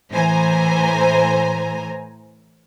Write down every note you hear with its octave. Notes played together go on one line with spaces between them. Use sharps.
A2 E3 C5 G#5 A#5